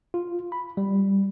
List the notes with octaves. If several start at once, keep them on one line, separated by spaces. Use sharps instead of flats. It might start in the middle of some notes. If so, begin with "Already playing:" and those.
F4
B5
G3